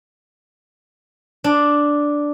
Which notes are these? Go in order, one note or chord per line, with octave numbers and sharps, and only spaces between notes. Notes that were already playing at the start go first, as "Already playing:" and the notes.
D4